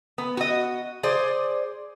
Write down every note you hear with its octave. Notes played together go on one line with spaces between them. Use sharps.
B3
F#4 D#5
G#4 C5 D5